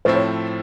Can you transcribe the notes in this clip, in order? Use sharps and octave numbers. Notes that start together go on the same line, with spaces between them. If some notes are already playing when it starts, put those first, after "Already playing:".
A2 F3 A3 C4 E4 C5
C#5